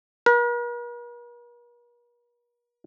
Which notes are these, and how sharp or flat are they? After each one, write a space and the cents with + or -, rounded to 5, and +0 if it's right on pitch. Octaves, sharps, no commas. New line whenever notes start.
A#4 +45